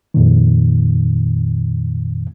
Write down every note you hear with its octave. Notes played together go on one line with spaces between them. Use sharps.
F2 A#2 D#3